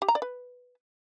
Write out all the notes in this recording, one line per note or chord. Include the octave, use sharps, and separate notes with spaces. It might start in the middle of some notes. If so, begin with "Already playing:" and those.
G4
A#5
D5
B4